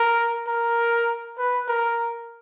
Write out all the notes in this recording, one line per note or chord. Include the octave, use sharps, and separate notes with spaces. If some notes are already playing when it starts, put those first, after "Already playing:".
Already playing: A#4
A#4
B4
A#4